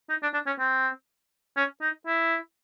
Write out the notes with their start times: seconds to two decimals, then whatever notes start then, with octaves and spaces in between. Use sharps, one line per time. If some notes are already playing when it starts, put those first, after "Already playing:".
0.09 D#4
0.23 D4
0.34 D4
0.47 C#4
0.59 C4
1.57 C#4
1.81 D#4
2.07 E4